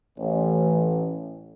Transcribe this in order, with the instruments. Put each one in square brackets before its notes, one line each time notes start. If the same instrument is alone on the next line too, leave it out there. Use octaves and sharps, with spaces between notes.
[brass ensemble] A1